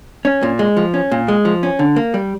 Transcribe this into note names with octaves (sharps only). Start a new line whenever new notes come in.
C#4
A#2
G#3
F3
C#4
A#2
G#3
F3
C#4
D3
A#3
G3